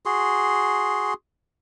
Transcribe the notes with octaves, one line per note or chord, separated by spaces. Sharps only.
F#4 G#4 C6